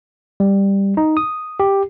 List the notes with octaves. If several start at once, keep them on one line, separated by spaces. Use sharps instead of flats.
G3
D#4
D#6
G4